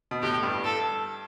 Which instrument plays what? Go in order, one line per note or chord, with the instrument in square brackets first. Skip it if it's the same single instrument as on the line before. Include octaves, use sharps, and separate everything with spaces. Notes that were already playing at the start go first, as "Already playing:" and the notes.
[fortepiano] B2
[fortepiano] A2 [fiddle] G4
[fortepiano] G2
[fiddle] A4